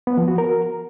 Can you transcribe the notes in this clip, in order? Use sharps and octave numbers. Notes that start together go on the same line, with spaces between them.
B3
F3
F#4
A#4